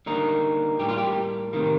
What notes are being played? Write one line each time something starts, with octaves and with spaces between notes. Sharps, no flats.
D3 G3 A#3 D#4
A2 G3 A#3 G4
F4
G4
C3 D#3 A#3